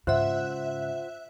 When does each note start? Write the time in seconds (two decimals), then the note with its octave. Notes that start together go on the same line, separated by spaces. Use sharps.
0.07 G#2 C#3 F4 C5 E5 F#5 F#6